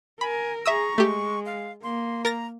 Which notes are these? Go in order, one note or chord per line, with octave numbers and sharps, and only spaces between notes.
A#4 G#5 B5
G#4 E5 A#5 C#6 D#6 E6
G#3 A3 G4
F5
A#3 C6
A#4 A#5 A6 A#6